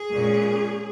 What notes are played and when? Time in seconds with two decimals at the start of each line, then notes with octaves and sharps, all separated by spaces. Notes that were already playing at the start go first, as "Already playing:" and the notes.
Already playing: G#4
0.12 A#2 G#3 C#4